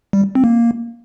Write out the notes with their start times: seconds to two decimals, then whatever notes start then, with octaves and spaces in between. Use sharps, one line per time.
0.13 G3
0.35 C4
0.44 A#3